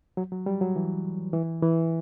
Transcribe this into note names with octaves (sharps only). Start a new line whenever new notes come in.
F#3
F#3
G3
F#3
E3
E3
E3